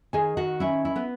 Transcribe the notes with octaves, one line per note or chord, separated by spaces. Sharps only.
D#3 G#4 G#5
D#3 F#4 F#5
C#4 E4 E5
E4
B3 B4